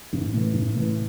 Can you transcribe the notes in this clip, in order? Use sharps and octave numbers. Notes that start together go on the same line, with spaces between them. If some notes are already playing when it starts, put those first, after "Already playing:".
A1
A2 E3
A1
A2 E3